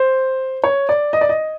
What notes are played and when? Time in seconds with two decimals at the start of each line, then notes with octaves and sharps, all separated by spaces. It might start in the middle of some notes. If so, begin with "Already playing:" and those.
Already playing: C5
0.64 C#5
0.89 D5
1.13 D#5
1.21 D5
1.29 D#5